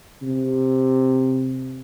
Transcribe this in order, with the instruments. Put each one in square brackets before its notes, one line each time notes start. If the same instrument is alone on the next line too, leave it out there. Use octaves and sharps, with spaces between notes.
[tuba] C3